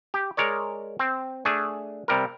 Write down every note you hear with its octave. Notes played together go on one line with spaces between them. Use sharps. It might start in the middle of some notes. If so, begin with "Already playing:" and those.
G4
G#3 A#4 C#5 D5
C4
A3 D4 G#4
C3 G3 A#4